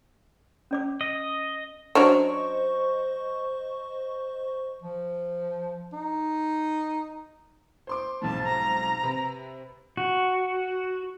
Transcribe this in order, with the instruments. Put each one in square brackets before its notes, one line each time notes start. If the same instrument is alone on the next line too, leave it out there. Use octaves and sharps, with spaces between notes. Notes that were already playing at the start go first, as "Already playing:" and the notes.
[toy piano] C#4 D5 D6
[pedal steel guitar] D#5
[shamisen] F#3 C#4 D4 [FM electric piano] C5 D#5 C#6
[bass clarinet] F3
D#4
[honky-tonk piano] C5 C6 D6
[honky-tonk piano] B1 F2 G#2 [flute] A5
[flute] A#5
[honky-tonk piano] C3 B4
[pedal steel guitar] F#4